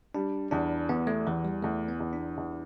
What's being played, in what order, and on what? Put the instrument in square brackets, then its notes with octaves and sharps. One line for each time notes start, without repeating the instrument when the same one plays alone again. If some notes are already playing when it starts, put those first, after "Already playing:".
[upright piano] G3 [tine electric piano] D4
[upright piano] E2 [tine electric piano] D4
[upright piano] E2 [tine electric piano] B3
[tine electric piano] A3
[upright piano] E2 [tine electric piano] E3
[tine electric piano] G3
[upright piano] E2 [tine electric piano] A3
[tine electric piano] B3
[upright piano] E2
[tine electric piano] D4
[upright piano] E2